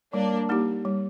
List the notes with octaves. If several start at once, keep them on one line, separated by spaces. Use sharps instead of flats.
G3 A#3 D4
A#3 D#4 G4
G3